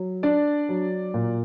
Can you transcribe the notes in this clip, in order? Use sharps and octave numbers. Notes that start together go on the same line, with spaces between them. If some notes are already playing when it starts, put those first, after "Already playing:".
Already playing: F#3
D4 D5
F#3
A#2